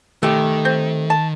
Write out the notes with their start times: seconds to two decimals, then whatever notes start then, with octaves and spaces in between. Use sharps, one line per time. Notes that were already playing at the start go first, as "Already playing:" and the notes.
0.23 D#3 A3 G4
0.65 C4
1.10 A5